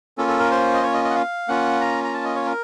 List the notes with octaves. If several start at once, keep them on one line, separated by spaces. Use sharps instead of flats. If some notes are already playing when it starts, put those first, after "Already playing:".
A#3 C#4 F4 A4
A4
A#4
C5
D#5
C#5
D#5
D#5
F#5
F5
A#3 C#4 F4 F#5
A#5
A#5
A5
D#5
C#5
A#4